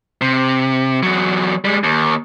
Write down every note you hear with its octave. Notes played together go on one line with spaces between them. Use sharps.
C3
E2 F#3
G3 G#3
D#2